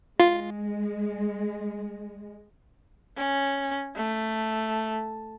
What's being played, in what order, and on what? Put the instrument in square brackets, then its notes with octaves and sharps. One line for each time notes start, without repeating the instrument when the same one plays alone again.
[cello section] G#3 [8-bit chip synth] F4
[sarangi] C#4
A3